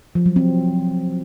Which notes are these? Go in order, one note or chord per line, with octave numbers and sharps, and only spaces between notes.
F3
F#3
C4